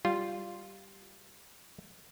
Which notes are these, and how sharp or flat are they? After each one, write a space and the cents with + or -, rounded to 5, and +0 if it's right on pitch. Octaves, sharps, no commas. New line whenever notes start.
G3 -5 F4 +0